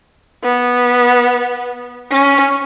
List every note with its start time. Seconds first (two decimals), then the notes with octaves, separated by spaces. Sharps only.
0.43 B3
2.11 C#4